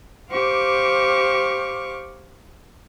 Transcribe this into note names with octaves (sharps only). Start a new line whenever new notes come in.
G4 C5 F5 C#6 D6